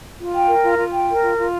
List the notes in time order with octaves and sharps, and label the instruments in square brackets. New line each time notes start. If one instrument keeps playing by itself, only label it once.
[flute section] F4
G5
A#4
F4
F4
G5
A#4
F4
F4